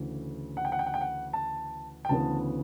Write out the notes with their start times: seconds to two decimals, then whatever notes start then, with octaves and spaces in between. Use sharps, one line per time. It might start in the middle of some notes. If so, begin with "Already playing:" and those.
Already playing: D2 C#3 E3 A3
0.57 F#5
0.65 G5
0.72 F#5
0.79 G5
0.86 F#5
0.94 G5
1.01 F#5
1.33 A5
2.05 G5
2.09 D2 C#3 E3 B3 A5